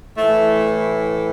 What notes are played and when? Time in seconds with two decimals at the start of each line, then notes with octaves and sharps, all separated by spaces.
0.18 A2 E3 A3